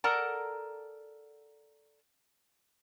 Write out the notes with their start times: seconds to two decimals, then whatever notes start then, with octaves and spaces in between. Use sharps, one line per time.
0.04 A4 A#4 D5 F#5 A5 A#5